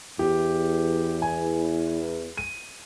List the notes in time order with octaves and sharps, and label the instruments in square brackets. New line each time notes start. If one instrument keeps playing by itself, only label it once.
[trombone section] E2 [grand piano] G4
[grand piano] G#5
D#7